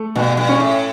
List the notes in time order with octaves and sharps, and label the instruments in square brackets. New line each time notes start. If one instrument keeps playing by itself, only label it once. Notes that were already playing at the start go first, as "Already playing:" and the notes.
Already playing: [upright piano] A3
[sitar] G2 [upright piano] B2
[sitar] G2
[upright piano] C#4
[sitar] A2